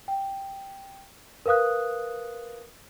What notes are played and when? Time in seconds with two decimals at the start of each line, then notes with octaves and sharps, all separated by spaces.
0.08 G5
1.46 A#4 B4 F5 D#6 F#6